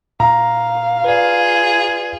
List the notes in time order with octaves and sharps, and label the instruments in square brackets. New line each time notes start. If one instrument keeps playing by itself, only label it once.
[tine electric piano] A#2 [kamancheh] F5 [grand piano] A#5
[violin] F4 G#4 [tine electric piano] B4 D5